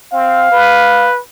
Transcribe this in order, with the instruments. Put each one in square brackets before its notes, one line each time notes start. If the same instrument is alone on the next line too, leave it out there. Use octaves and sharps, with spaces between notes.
[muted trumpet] C4 [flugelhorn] F5
[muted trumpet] B4